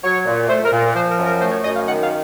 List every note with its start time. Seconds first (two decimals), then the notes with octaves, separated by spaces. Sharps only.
0.04 F#3 C#5
0.26 A#2
0.49 A3 C5
0.64 A#4
0.72 A#2
0.79 A#4
0.94 F3 C5
1.10 A#4
1.18 F#2
1.26 A#4
1.41 A3 C5
1.51 C#5
1.63 F#2 D#5
1.75 F5
1.86 D#3 F#5
2.02 F5